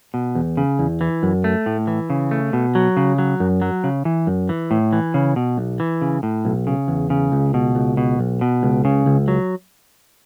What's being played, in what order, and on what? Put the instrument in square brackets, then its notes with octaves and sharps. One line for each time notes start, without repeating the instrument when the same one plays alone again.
[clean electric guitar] B2
E2
C#3
E2
E3
F#2
A3
A2
E3
C#3
A3
B2
F#3
C#3
F#3
F#2
F#3
C#3
E3
F#2
E3
A2
E3
C#3
B2
B1
E3
C#3
A2
B1
C#3
E2
C#3
C#2
B2
C#2
B2
B1
B2
C#2
C#3
C#2
F#3